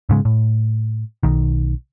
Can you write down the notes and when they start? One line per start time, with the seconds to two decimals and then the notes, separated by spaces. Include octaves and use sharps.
0.09 G#2 C#3 G#3
0.25 A2
1.23 B1 D#3